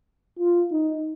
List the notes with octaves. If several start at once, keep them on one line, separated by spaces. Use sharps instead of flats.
F4
D#4